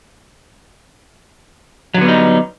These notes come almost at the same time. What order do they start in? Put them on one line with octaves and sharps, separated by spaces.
F#3 D3 B3 G3 D#4